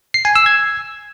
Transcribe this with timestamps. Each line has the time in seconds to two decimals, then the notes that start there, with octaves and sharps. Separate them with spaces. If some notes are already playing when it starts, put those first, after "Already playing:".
0.14 C7
0.25 G#5
0.36 E6
0.46 G#6